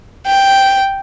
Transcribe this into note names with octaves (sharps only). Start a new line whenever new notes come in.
G5